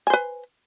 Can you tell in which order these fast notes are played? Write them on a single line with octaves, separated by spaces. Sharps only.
G#5 C5 B4